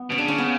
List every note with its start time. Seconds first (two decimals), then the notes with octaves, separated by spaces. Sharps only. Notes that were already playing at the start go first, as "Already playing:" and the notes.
Already playing: B3
0.10 B2 C#4
0.18 C#3 D4
0.28 C#4
0.38 B3